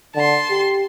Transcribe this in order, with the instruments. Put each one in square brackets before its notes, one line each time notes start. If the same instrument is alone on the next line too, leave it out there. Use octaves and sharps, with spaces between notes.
[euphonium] D3 [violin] A5 C6
[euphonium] G4